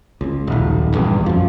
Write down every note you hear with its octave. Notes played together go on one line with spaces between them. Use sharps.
C#2
D#1 B1
A#1 E2 G2
F#2 F3